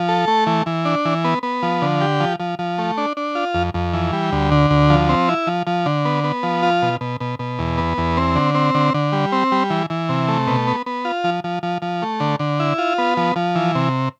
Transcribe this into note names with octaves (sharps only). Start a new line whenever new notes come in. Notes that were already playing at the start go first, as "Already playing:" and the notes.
Already playing: F3
A4
A3
E3
E3
D4
E3
B3
B3
F3
D3
G4
F3
F3
F3
A3
D4
D4
F4
F2
F2
E3
G3
D2
D3
D2
F3
C4
E4
F3
F3
D3
B3
B3
F3
F4
B2
B2
B2
B2
E2
B3
E2
C4
D3
C4
D3
D3
G3
C4
G3
E3
E3
C3
A3
B2
B3
B3
F4
F3
F3
F3
F3
A3
D3
D3
E4
F4
B3
F3
F3
E3
C3